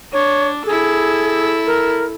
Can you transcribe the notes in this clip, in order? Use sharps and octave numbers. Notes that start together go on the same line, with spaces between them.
D4 C#5
E4 G#4 A4
A#4